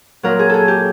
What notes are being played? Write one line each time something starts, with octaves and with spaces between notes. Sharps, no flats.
A#2 F#3 A#4
G#4
G#4 A4
G4